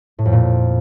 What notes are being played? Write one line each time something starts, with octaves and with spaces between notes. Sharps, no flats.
A2
F2
A#2